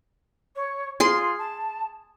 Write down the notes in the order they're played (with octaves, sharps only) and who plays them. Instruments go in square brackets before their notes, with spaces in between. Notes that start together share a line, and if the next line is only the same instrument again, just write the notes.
[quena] C#5
[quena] F4 [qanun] G#4 C6
[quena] A5